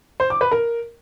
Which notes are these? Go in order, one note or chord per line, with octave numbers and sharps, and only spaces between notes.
C5
D6
B4
A#4